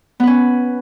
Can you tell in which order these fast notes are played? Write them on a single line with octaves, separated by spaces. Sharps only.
B3 B4 C#4